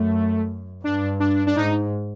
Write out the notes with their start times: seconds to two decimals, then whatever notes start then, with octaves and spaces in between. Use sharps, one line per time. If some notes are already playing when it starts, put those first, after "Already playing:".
Already playing: F#2 A3
0.84 G2 D4
1.20 D4
1.47 D4
1.56 G#2 D#4